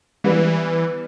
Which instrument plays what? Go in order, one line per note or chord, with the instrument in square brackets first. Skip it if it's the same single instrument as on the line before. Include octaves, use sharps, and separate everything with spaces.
[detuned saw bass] E3 [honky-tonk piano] G3 B3